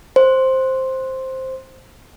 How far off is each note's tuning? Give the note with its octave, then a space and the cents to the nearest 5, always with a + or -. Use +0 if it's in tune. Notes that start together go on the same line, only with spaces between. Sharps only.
C5 +5